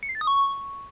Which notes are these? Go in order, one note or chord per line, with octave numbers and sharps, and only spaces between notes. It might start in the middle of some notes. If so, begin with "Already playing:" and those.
C#7
C7
A6
D#6
C#6